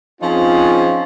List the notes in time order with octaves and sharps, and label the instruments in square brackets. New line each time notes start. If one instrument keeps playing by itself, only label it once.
[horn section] F3 C4 C#4 D#4 F4 G#4